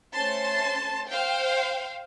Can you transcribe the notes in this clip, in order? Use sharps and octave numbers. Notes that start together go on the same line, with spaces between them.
A3 C#4 C5 A5 C6
C5 F5 G5